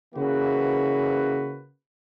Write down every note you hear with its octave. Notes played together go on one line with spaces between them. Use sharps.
C#3 E3 A#3 F#4 B4